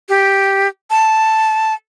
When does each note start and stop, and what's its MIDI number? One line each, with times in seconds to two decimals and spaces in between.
0.09 0.67 67
0.90 1.74 81